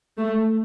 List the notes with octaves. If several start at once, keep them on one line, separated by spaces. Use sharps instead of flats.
A3